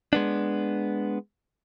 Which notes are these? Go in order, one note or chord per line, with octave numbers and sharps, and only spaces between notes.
G#3 B3 D4